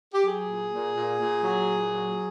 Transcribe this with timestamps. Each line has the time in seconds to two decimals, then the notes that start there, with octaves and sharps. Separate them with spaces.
0.14 G4
0.24 F#3 G#4
0.49 A#2
0.73 A#2
0.96 A#2
1.20 A#2
1.44 F#3
1.68 A#2
1.92 F#3